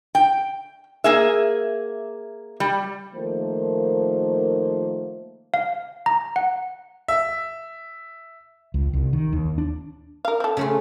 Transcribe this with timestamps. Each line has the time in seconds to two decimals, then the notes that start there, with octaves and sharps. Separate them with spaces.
0.15 G5
1.04 A#3 G#4 E5
2.60 G3
3.14 D#3 F3 A3 A#3 C5
5.54 F5
6.06 A#5
6.36 F#5
7.08 E5
8.74 C#2
8.93 C2
9.13 D#3
9.33 D#2
9.58 D4
10.25 A#4 F5
10.40 C4 A4
10.57 C#3 A3 F4